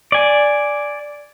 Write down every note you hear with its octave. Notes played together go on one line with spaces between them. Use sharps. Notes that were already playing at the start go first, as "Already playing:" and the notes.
D5 G#5